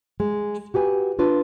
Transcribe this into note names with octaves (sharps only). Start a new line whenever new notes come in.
G#3
F#4 G4 B4 G#5
D4 F4 B4